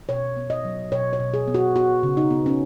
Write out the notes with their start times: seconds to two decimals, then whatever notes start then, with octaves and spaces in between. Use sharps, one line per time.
0.09 B2 C#5
0.37 B3
0.50 D#5
0.65 F#3
0.92 B2 C#5
1.13 C#5
1.20 B2
1.34 G#4
1.48 B3
1.54 F#4
1.76 B3 F#4
2.03 C#3
2.17 D#4
2.30 B3
2.46 C#4